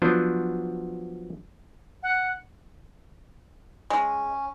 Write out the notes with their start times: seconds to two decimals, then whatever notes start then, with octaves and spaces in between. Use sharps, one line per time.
0.02 F3 F#3 B3 D4 C5
2.03 F#5
3.90 G#3 C#4